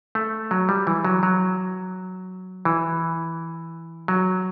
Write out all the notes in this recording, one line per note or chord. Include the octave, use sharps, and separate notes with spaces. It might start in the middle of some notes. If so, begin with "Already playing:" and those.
A3
F#3
G3
E3
F#3
F#3
E3
F#3